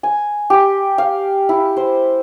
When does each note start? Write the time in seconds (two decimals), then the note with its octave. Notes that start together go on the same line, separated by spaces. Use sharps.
0.03 G#5
0.50 G4
0.98 F5
1.49 E4
1.77 C5